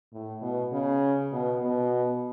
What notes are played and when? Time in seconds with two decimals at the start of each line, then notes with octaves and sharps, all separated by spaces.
0.13 A2
0.42 B2
0.72 C#3
1.32 B2
1.63 B2